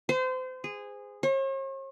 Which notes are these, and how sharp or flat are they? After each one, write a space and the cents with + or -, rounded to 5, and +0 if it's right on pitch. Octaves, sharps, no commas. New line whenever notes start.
C5 -30
G#4 -15
C#5 -45